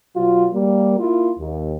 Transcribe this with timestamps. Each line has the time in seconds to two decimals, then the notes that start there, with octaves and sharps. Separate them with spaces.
0.16 B2 F#3 F4
0.52 G3 A#3
0.99 A#3 E4 F4
1.39 D#2